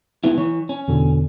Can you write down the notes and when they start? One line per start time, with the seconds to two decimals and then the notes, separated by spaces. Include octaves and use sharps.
0.24 C#2 B3 E4
0.38 E3 C#5
0.69 C#4
0.88 E2 B2 D3